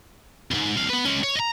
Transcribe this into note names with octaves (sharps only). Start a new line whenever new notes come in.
F2 G#2
C2 F5
B3 B4
G#3 C#4
C#5
D#5 A#5